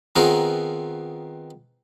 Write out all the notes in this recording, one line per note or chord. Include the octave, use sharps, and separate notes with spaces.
D#3 B3 C4 F4 G#4 A#4